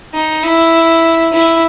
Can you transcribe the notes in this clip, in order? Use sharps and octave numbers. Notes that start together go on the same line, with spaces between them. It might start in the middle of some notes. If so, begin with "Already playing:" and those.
D#4
E4
E4